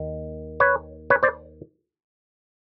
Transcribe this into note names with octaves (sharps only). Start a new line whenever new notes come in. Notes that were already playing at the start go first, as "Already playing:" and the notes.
Already playing: D#2 D#3
B4 C#5
B4 C#5
C5 D5